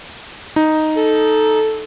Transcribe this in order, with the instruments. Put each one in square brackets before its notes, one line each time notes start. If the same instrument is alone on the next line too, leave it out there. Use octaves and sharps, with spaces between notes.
[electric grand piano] D#4
[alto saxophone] A4